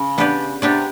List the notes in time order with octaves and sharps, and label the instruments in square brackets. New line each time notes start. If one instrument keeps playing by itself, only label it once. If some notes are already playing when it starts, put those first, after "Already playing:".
Already playing: [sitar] C#3
[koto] B3 D4 G4 B4 D5
[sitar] C3 [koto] B3 D4 G4 B4 D5